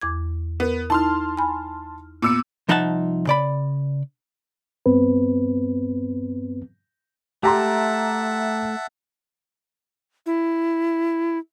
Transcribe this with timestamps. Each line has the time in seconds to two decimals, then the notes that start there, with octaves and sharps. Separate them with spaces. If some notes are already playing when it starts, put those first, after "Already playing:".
0.02 E2 D6 G#6
0.60 B3 A#4
0.90 D#4 E4 A5 C6 F6
1.37 G#5 B5
2.22 A#2 B3 E6 C#7
2.69 C2 F3 D#4 E5 F#5 A5
3.27 C#3 D5 B5
4.86 G2 B3 C4 B4
7.43 A3 G4 E5 F#5 A5 A#5 C6
10.26 E4